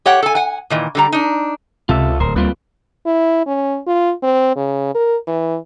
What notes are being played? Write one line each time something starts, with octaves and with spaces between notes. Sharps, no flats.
G4 C#5 F#5 G5
A4 G#5
F#5 G#5
A#2 D#3 E3
D3 G3 A#5
D4 D#4
C#2 C3 F4 A4 E5
D1 A#4 C5
D2 G3 A#3 C4 F4 B4
E4
C#4
F4
C4
C#3
A#4
E3